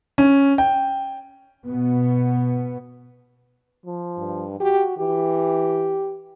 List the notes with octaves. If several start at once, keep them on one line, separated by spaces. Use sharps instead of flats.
C#4
G5
B2 B3
F3
G2
F#4 G4
E3 G4